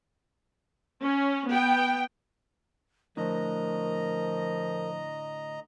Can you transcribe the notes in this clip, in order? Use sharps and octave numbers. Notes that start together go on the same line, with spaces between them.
C#4
B3 G5
A2 D3 F3 A#4 D#5 A#5